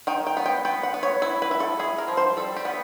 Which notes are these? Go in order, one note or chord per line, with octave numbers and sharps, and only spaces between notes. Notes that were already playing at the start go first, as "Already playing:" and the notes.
D#3 G5
G5
B3
G5
B3 G5
F#5
B3
C#5
E4
B4
E4
A4
E4 G#4
A#4
F3
C5
G3 A4
G4
B3